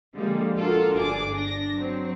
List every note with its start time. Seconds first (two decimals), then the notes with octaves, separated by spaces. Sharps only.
0.14 D3 F3 G3 G#3 A#3
0.57 D4 F4 F#4 A4 A#4
0.95 G1 D4 G#4 D6
1.31 D4 A#6
1.74 F#3 C4